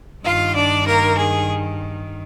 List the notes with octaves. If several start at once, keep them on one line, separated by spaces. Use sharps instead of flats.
G2 D#3 F4 F5
D4 D5
A#3 A#4
G#4